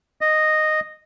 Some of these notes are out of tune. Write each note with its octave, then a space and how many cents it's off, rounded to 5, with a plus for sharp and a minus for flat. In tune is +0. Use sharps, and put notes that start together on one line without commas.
D#5 -10